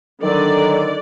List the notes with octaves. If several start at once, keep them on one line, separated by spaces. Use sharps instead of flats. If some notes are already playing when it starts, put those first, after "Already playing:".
D3 D#3 F#3 D5